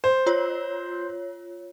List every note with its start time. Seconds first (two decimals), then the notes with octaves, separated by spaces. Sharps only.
0.04 C5
0.26 F4 C#5